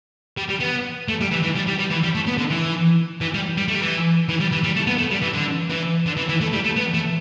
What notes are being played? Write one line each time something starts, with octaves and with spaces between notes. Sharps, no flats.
G3
G3
B3
A3
G3
E3
E3
G3
G3
G3
E3
G3
A3
B3
D3
E3
E3
G3
G3
A3
G3
E3
E3
G3
E3
G3
A3
B3
A3
G3
E3
D3
E3
D3
E3
E3
A3
G3
A3
B3
A3